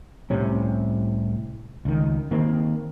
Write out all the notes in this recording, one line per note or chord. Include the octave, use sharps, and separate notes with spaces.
C2 A2 C3 C#4
C#2 D#3
D#3 A#3 C4